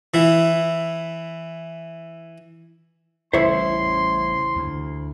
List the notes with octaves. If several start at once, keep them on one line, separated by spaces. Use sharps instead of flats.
E3 E4
A1 C#3 G3 E4 C5 C#5 E5 C6
D2